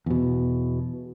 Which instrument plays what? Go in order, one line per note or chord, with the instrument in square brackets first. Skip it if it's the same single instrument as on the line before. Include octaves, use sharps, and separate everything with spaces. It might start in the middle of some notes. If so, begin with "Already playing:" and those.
[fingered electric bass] E2 B2